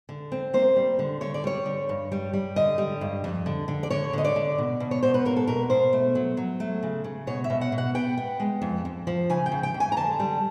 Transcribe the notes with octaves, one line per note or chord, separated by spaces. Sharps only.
D3
C4
A#3 C5
G3
D3
D3 C#5
D5
G3 C#5
D3
G2
G3
G3
D3 D#5
G3
G2
F2
D3
D3
D5
D3 C#5
D3 D#5
D5
D3
B2
B2
C#5
B2 C5
B4
A#3 A#4
A4
B2 A#4
B2 C5
A3
F#3
F#3
A3
C#3
C#3
B2 C#5
E5
B2
F#5
B2
F#5
B3 G5
B3
G#3
F2
F2
F3
C#3 G#5
G5
C#3
G5
F2
G#5
A#5
D3 A5
G3